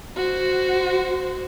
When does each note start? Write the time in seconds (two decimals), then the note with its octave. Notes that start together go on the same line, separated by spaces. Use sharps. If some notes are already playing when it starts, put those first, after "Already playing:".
0.16 F#4 C5